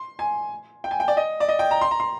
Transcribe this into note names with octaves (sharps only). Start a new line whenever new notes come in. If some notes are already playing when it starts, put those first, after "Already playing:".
Already playing: C6
G#5
G5
G#5
G5
D5
D#5
D5
D#5
G5
A#5
C6
A#5
C6